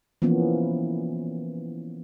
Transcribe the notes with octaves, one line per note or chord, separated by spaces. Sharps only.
E3 F3 A#3 B3 C#4